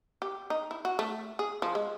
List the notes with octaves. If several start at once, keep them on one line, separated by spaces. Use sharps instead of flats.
G4
D#4
E4
F#4
A3
G#4
F3
G#3